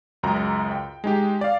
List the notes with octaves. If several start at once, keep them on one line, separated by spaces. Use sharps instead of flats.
C#2 F#2 A#5
G5
G#3 D#4 G4
D5 F5